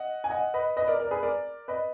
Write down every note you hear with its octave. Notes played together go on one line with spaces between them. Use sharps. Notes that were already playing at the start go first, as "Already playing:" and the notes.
Already playing: D#5 F#5
G#5
D#5 F#5
B4 D#5
B4 D#5
A#4 D5
A#4 D5
G#4 B4
A#4 D5
B4 D#5